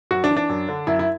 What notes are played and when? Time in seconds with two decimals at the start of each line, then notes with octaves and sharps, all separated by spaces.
0.11 F#2 F#4
0.24 D4
0.30 E3
0.37 D4
0.50 F#2
0.69 D3
0.87 F#2 E4
0.99 E4